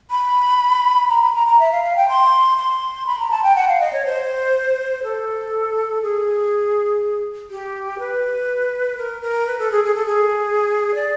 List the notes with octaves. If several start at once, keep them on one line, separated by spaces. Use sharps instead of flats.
B5
A#5
B5
A#5
A#5
E5
F5
F5
G5
C6
C6
B5
A#5
A5
G5
F#5
F5
D#5
C#5
C5
A4
G#4
G4
B4
A#4
A#4
B4
A4
G#4
G#4
A4
G#4
D5